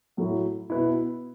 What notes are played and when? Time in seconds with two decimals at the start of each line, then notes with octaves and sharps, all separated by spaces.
0.17 A2 F#3 A3 E4
0.70 B2 B3 E4